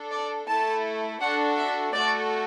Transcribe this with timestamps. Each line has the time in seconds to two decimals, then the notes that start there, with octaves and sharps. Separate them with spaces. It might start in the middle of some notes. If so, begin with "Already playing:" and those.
Already playing: D4 A4
0.11 D5
0.48 A3 E4 A4 A5
1.21 D4 F#4 A4 F#5
1.57 E5
1.93 A3 F#4 A4 D5